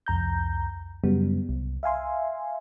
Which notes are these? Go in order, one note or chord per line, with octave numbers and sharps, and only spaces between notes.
C2 F2 A#5 G6
F#2 C#3 F#3 G3 B3
C2
E5 F5 G#5 C6